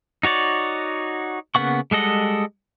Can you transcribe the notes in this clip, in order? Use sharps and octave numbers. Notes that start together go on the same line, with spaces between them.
D#4 F#4 C#5 D5
C#3 A#3 B3 F#5 C#6
G3 G#3 A4 D#5 F#5